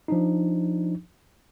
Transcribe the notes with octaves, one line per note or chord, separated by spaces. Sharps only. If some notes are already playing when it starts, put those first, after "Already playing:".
F3 D4 D#4